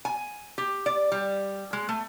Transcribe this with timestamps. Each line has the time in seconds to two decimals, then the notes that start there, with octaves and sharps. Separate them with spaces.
0.05 G#5
0.58 G4
0.86 D5
1.12 G3
1.73 G#3
1.89 A3